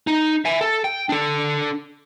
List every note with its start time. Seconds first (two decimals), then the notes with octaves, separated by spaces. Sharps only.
0.07 D#4
0.45 E5 G#5
0.61 A4
0.84 G5
1.09 D4 A4